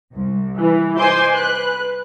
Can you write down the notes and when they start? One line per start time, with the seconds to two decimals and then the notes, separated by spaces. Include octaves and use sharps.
0.13 C2
0.58 E3
0.98 C5 D#5 G#5 C6 D6 G6
1.33 B4 F#6